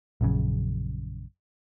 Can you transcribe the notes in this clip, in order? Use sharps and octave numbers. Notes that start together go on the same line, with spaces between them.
A#1 F#2 C#3